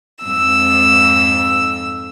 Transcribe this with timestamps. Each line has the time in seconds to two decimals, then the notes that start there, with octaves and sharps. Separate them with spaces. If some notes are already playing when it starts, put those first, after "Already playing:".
0.24 F2 G#2 E6